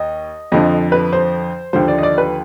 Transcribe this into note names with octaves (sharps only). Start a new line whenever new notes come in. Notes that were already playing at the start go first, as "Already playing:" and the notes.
Already playing: D#2 D#5
F2 D3 F3 D#5
B4
C5
D#2 D3 F3 C5
D5
D#5
D5
B4